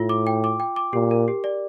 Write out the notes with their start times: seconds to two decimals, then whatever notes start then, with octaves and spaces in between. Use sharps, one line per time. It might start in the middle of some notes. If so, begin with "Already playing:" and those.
Already playing: A2 F4
0.09 D6
0.27 G5
0.44 D6
0.60 G5
0.76 D6
0.93 A#2 G4
1.11 A#4
1.28 G4
1.44 D5